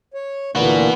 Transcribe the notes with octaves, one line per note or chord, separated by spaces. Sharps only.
C#5
D2 A#2 E3 A#3 B3 F#4